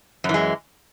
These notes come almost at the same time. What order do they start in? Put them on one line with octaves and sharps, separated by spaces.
F#2 E3 G#3